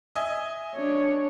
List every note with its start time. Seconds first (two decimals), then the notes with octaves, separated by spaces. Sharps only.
0.15 D#5 E5 G#5
0.75 D4 C#5